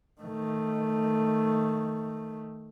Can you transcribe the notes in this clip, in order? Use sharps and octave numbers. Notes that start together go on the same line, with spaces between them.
D#3 A3